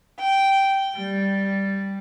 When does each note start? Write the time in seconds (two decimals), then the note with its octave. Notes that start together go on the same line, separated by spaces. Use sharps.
0.20 G5
0.97 G3